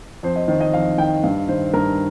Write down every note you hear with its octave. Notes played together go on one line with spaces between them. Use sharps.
F2 C5
D#5
D#3 C5
D#5
F2 F5
D#3 G5
G2 F5
D#3 C5
G2 A#4